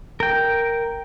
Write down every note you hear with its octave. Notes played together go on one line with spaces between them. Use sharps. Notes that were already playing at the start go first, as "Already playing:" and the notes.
A#4 G5